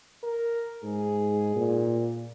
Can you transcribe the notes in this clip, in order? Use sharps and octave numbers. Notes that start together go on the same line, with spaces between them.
A#4
G#2 G#4
A#2